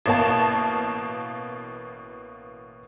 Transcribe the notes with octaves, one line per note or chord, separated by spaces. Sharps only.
A1 B2 A#3 A5